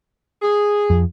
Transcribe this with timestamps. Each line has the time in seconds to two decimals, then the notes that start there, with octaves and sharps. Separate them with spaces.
0.42 G#4
0.90 F2